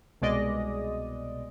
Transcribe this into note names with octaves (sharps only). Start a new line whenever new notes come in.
C2 B2 G#3 D5 D#5